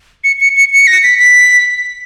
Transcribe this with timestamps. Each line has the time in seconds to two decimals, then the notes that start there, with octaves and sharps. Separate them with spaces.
0.24 C#7
0.40 C#7
0.57 C#7
0.73 C#7
0.87 A#6
1.03 B6
1.19 B6